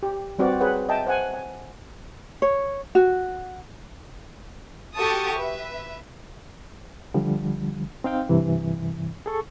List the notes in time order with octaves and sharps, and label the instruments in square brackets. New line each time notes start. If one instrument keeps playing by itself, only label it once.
[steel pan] G4
G3 C4 F#4 B4 D5
G#4 B4 C#5 F#5
D#5 E5 G5 A5
C5 F#5 G#5
G#5
[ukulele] C#5
F#4
[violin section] F#4 G4 A4 A5 C#6 D#6
B4 E5
[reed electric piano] D3 F3 G3
C4 D#4 F5 G5
G2 C3 E3
G#4 A4 C#6